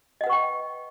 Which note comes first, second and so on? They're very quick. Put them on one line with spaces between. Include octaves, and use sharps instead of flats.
D#5 F#5 B4 C#6 G5